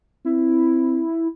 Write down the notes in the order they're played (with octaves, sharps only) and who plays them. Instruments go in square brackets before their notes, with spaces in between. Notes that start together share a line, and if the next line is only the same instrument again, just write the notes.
[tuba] C4 [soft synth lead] E4